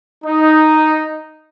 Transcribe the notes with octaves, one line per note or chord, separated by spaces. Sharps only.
D#4